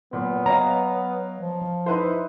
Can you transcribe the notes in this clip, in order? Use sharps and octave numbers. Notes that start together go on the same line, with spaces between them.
A#2 F#3 B3
C#5 D#5 F5 A#5
F3
D#4 E4 B4 C5